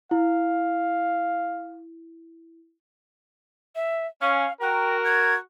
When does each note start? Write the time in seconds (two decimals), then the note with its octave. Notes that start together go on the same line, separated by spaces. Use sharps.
0.11 E4 F5
3.75 E5
4.22 C#4 F5
4.61 F#4 A#4 G5
5.04 G#6